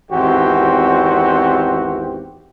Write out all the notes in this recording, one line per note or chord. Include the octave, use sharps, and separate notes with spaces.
G#1 E2 C4 F#4 G4